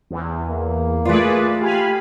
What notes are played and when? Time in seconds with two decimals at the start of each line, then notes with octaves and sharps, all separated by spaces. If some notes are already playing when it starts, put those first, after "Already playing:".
0.11 E2
0.49 A#3
1.05 A3 F4 G#4 B4 D5
1.61 G4 F5 G#5 B5